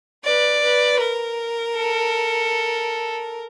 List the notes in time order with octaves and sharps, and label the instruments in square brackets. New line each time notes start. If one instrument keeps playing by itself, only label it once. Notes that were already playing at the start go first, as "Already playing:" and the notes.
[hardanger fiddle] B4 [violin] D5
[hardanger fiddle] B4
[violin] A#4
[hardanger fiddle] A4